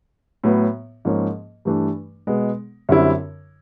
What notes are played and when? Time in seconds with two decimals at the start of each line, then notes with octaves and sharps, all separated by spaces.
0.44 A2 F#3 B3
1.05 G#2 F3 A#3 C#4
1.65 G2 E3 A3 D4
2.27 B2 G#3 B3
2.89 F#2 D3 G3 C4 E4